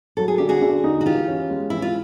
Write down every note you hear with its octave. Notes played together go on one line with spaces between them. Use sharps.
F#3 A4
G#4
D3 G4
F#4 G#4
D3
D#4
F#4
E3 F4 G4
C#4
G#3
E3 E4
F4